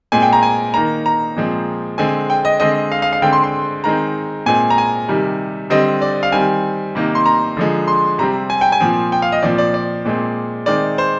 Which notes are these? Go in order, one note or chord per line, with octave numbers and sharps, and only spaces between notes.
A#2 G#3 C4 G#5
G5
A#5
G#5
D#3 A#3 A#5
A#5
A#2 F3 G#3 C4
D3 G#3 C4 G#5
G5
D#5
D3 G#3 C4 D#5
F5
F5
F5
D3 G#3 C4 G5
C6
C6
D#3 G#3 C4 A#5
A#2 G#3 C4 G#5
A#5
G#5
C3 D#3 G3
D3 G3 C4 D#5
D5
F5
D#3 G3 C4 G#5
C3 D#3 A#3
C6
A#5
D3 F3 G#3
C6
C3 G3 C4 A#5
G#5
G5
G#5
A#2 F3 C4
G5
F5
D#5
A#2 F3 C4 D5
D5
D5
A#2 G#3 C4
D#3 G#3 C4 D5
C5